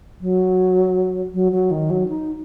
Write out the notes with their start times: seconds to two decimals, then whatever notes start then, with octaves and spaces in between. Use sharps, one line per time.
0.21 F#3
1.34 F#3
1.52 F#3
1.71 D#3
1.90 F#3
2.08 D#4